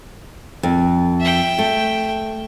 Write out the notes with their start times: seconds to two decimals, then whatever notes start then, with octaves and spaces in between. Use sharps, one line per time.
0.63 F2
1.20 E5 G5
1.58 A3